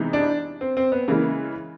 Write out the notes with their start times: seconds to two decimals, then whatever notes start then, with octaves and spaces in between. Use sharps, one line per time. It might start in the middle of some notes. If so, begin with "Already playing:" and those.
Already playing: C3 E3 G#3 B3 D#4
0.13 D4
0.61 C4
0.77 C4
0.92 B3
1.08 C#3 E3 G#3 A#3